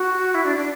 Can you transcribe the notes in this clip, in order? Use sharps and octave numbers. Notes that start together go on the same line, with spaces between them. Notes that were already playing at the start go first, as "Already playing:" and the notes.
Already playing: F#4
E4
D4
D4